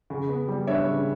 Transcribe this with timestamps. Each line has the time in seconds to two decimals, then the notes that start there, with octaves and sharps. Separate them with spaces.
0.10 C#3
0.29 B3
0.48 G3
0.67 D4 C#5 E5
0.87 C#3